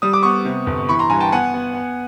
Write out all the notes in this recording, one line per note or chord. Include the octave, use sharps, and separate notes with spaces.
G3 D#6
D6
B3 C#6 D#6
C3
G1
E3 B5 C#6
A#5 C6
G2 G#5 A#5
G5 A5
B3 F#5 G#5
B3
B3